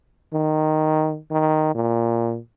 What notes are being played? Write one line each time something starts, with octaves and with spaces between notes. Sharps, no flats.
D#3
D#3
A#2